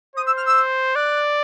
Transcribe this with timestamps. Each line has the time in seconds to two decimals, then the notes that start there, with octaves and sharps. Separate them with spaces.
0.16 C5 D#6
0.26 E6
0.36 F6
0.46 E6
0.95 D5 F#6